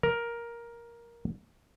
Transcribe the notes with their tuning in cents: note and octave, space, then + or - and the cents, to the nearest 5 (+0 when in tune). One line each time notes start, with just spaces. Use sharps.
A#4 +10